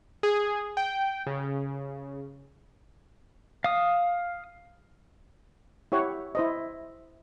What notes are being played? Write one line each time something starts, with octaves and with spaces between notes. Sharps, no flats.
G#4
G5
C#3
F5 D#6
E4 G4 C#5 F#5
E4 C5 D#5